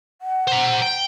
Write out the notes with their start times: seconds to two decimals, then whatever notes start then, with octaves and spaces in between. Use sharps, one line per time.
0.22 F#5
0.47 C5 A#5
0.82 G5